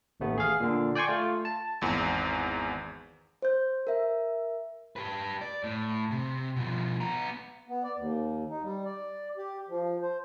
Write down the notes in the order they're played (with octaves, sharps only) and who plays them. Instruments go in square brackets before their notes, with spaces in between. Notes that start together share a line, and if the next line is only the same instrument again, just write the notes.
[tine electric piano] A1 D#2 A3 B3
G#4 F5
A#2 D3
D5 G5 G#5 C6 C#6
A3 F4
A5
[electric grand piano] G#1 E2
[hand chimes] C5 G6
A#4 E5
[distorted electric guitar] G4 B4
D5
A2
C3
B2 F3
B3 A#5
[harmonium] B3
D5
D#2
D#4
G3
D5
G4
F3
C5